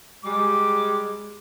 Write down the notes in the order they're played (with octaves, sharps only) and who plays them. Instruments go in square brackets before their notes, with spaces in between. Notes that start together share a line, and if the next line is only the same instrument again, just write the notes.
[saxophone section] G3 G#3 [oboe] D6